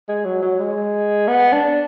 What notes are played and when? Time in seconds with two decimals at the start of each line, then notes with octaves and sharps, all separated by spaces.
0.08 G#3
0.25 F#3
0.42 F#3
0.59 G#3
1.28 B3
1.53 D4